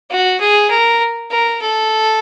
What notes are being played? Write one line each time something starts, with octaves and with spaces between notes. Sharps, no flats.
F#4
G#4
A#4
A#4
A4